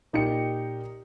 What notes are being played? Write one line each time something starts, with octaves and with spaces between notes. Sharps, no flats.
A#2 D#4 G4 G5 C#7